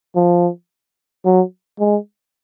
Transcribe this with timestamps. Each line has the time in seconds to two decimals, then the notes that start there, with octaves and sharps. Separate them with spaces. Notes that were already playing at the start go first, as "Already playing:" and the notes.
0.15 F3
1.25 F#3
1.80 G#3